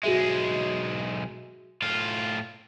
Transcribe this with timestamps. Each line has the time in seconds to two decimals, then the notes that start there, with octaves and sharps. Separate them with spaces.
0.03 B1 G#3 F#4 G#4 E5
1.82 A2 F4